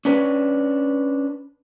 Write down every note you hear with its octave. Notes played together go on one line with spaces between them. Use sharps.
C#4 D4 B4